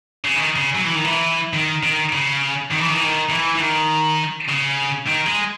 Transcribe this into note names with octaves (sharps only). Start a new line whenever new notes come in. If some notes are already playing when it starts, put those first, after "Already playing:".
C#3
D#3
C#3
F#3
E3
D#3
E3
D#3
D#3
C#3
D#3
E3
D#3
E3
D#3
E3
E3
D#3
C#3
D#3
G#3